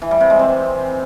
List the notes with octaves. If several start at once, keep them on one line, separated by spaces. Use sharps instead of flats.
E3
G3
C3
G#3
C4